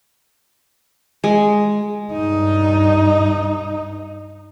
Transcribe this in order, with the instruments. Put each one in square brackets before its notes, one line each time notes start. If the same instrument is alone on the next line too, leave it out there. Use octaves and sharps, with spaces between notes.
[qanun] G#3
[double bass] G2 D#4